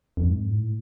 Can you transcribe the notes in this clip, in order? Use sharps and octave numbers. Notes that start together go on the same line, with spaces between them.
F2
G#2
A2